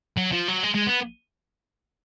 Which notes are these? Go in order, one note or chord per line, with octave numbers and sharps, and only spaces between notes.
F#3
F3
F#3
G#3
G#3
B3